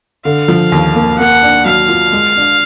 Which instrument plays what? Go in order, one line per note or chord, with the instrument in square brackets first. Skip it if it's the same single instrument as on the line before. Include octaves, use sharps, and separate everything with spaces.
[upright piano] D3 [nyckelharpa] F5
[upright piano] F3
D#2
A#3
[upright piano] A#3 [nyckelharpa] F#5
[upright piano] D4
[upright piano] F#3 [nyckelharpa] F5
[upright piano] F4
G#3
D4